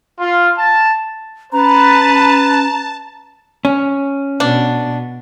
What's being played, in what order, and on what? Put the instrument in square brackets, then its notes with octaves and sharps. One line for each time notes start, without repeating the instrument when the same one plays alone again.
[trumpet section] F4
A5
[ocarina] C#4 [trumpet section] B4 [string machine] A5 [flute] A#5
[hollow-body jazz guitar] C#4
[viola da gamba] B2 [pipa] D4